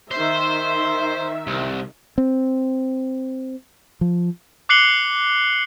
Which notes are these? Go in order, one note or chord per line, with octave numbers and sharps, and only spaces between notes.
D#3 C5 E5
C2
C4
F3
D6 F#6 C7 C#7 F#7 G7